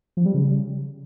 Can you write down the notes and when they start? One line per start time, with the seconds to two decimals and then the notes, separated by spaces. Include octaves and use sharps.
0.17 F3
0.26 G3
0.34 C#3